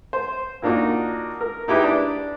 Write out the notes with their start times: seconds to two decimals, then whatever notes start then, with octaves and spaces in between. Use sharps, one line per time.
0.13 C5
0.62 A#2 A#3 D4 D#4 F#4
1.41 A#4
1.68 D#4 E4 G4 G#4 B4
1.84 D4